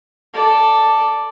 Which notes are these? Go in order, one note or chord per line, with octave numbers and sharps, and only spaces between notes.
A4 D5